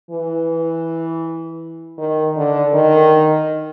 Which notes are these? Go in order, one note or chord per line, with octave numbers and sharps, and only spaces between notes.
E3
D#3
D3
D#3